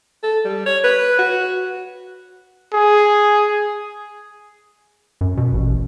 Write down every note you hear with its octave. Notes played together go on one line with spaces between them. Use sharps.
A4
G3
C#5
B4
F#4
G#4
F#2
B2
A1